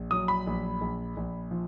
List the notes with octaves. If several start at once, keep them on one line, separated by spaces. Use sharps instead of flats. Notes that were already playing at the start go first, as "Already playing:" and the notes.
Already playing: A#1
F#3 D#6
B5
A#1
A#1
A#1
F3